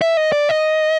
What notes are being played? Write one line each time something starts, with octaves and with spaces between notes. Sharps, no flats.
E5
D#5
D5
D#5